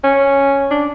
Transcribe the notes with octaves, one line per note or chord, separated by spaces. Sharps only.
C#4
D4